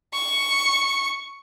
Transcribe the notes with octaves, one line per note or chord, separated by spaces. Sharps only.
C#6